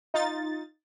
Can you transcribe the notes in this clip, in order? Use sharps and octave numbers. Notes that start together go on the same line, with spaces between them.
D#4 F4 A6